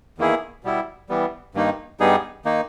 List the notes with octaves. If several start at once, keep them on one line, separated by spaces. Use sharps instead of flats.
E2 D#3 A#3 E4 G#4
B2 G3 B3 E4
E3 G3 B3
G2 D#3 A#3 D#4
G2 G3 B3 D#4 G#4
D#3 A#3 D#4